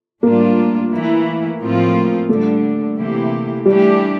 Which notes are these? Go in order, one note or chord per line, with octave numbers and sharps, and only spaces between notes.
A2 G3 A#3 D4 F4
E3 A3 E4
A2 F3 C4 F4
D3 G3 A3 D4
C3 E3 A#3 E4 G4
E3 G3 A3 D4 G4